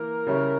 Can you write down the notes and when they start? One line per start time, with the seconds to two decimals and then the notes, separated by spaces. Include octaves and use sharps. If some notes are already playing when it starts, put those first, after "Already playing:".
Already playing: E3 A#3 A#4
0.27 C#3 G3 C#4 E4